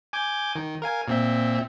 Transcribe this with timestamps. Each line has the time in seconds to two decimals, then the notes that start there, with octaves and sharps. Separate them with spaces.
0.13 G#5 D6 G6
0.56 D#3
0.82 A#4 F5 G#5
1.08 A#2 C4 E5